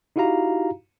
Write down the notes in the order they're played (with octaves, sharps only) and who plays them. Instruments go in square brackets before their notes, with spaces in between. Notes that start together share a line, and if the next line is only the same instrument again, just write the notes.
[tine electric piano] D#4 E4 F#4 G4 F5 A#5